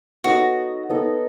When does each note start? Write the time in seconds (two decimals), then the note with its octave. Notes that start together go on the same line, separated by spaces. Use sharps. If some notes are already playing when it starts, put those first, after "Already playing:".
0.24 B3 D#4 F#4 A4 D#5
0.89 B3 D#4 A4 D#5